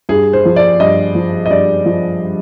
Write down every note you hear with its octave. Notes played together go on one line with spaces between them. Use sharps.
G2 G#4
C5
F3
D5
G2 D#5
F3
D#5
G2 D5
F3